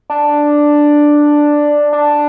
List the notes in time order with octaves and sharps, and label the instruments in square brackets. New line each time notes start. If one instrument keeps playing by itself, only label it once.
[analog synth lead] D4
D4